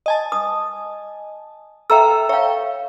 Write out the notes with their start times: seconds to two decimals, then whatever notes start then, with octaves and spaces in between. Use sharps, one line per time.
0.06 D#5 G#5 A5
0.32 D#6
1.90 A4 E5 F5 G5 A#5 E6
2.29 C#5 E5 F5 G5